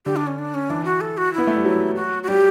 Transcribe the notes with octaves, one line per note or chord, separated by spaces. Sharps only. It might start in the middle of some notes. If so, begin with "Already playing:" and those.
D3 G4
D4
C#4
D4
C#4
E3 D4
F#4
A4
F#4
B3 E4
A3
G3
F#3
F#4
F#4
G3 G4